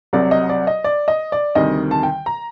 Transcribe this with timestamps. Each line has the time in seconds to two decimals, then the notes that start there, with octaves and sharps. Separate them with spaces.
0.13 C2 C3 F#3 D5
0.31 D#5
0.49 D5
0.67 D#5
0.84 D5
1.08 D#5
1.32 D5
1.55 D2 C3 D#3 G3 D#5
1.91 A5
2.03 G5
2.26 A#5